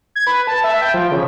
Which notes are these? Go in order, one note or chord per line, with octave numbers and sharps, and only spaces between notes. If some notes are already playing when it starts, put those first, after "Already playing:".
G#6
B4
A5
E5
G5
F3
C#3